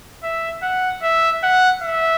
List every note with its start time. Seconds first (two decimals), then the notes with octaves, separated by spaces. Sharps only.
0.23 E5
0.62 F#5
1.02 E5
1.43 F#5
1.82 E5